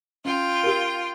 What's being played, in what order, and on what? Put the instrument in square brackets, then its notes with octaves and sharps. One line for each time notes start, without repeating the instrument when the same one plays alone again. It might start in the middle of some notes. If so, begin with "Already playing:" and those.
[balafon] C#4 [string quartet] F4 G5
[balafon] G4 A#4